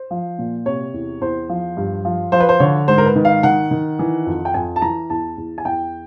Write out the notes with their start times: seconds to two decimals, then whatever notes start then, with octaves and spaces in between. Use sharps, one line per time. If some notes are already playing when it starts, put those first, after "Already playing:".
Already playing: C5
0.11 F3
0.39 A#2
0.66 C3 C#5
0.94 E2
1.21 E2 C5
1.49 F3
1.77 G2
2.05 F3
2.32 F3 C5
2.40 B4
2.49 C5
2.60 D3 C#5
2.88 G#2 C5
2.98 A#4
3.06 B4
3.16 D#3
3.25 F5
3.43 D#3 F#5
3.71 D#3
3.99 E3
4.27 F2
4.45 G5
4.54 F2 G#5
4.76 A5
4.82 E3 A#5
5.10 E2 A5
5.38 E2
5.58 G#5
5.65 E2 G5